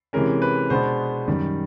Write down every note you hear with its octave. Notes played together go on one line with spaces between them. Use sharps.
C3 E3 G#3 C#4 A#4
B4
B2 G#3 B3 D4 C5
F#2 D#3 G3